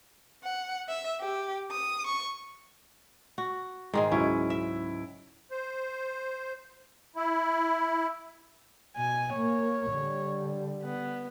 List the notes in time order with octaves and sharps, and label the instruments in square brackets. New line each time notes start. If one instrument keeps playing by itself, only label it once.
[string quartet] F#5
E5
G4
D#6
C#6
[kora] F#4
G#2 D#3 G#3
[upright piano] C#2 F#3 E4 [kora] C#4
[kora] E5
[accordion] C5
E4
[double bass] B2 [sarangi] G#5
[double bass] A#3 [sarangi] C#5
[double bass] D3 G3
[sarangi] B3